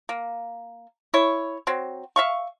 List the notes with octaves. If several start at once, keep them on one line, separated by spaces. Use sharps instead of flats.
A#3
E4 C#5
F#3 C4
E5 F5 C#6